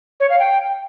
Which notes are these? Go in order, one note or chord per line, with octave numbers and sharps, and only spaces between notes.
C#5
F5
G5